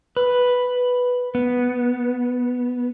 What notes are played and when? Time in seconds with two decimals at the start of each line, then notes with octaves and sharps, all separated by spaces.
0.17 B4
1.35 B3